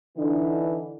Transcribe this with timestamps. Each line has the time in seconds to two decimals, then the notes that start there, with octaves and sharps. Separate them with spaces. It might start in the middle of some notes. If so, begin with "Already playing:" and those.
0.17 D3 E3 D#4